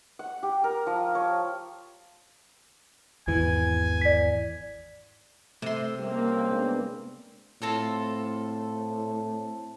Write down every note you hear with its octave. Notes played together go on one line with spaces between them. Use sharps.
F#5
G4
A#4
F3
C#5
G#1 E2 E3 G#5
D5 B6
C3 A3 C6 E6
C#2 G3 A#3 C4
G#3 B3 D4
A2 C4 F4 A4